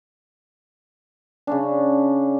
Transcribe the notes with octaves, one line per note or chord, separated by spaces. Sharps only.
C#3 C#4 D4